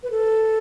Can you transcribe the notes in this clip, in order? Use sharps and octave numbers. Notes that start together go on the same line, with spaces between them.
B4
A4